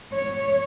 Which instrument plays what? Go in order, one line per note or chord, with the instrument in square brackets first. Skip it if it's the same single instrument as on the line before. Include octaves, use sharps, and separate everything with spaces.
[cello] C#5